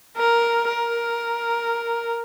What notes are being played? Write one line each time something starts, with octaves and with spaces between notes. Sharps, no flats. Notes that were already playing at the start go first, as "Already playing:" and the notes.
A#4
A#4